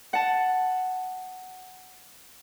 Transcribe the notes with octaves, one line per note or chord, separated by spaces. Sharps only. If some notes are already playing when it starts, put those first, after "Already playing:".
F#5 A5